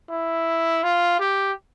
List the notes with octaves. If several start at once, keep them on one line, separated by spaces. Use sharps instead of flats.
E4
F4
G4